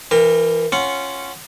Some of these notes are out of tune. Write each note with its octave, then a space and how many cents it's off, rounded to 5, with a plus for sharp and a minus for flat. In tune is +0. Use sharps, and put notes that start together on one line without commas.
E3 +20 A#4 -10 G5 +35
C#4 -5 F4 -15 F#5 +0